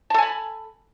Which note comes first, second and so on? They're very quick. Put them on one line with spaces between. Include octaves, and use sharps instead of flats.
A5 A4 G#5 B5